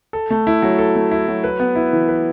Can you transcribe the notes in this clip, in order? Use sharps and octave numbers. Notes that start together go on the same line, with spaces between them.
A4
A3
E4
F#3
A4
A3
E4
F#3
B4
B3
E4
E3
B4